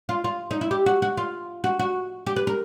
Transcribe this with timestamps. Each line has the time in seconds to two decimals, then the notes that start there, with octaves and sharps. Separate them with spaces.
0.09 F4
0.24 F4
0.51 D#4
0.61 E4
0.71 G4
0.86 F#4
1.02 F#4
1.17 F4
1.64 F#4
1.79 F#4
2.26 G4
2.36 B4
2.47 A#4